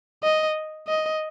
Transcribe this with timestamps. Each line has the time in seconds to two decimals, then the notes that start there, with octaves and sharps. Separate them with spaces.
0.23 D#5
0.88 D#5